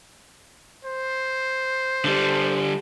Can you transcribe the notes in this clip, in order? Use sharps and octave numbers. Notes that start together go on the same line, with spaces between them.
C5
D3 G3